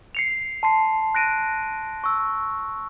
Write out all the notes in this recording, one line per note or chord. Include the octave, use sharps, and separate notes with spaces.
C7 C#7 F7
A5 C6 C7
F#6 A#6 D7 D#7
C#6 E6